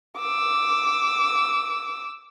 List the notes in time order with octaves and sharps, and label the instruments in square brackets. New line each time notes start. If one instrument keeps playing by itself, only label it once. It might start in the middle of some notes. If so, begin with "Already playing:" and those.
[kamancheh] D6 E6